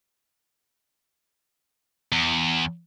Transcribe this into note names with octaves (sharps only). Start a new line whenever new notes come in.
E2